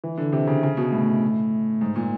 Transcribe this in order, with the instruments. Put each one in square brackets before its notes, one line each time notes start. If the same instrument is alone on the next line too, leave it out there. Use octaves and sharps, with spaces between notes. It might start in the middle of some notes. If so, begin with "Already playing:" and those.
[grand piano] E3
D3
C3
C#3
C#3
B2
A2
G#2
A#2